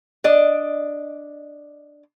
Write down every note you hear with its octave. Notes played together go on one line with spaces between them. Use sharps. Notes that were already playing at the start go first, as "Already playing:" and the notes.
D4 D5 D#5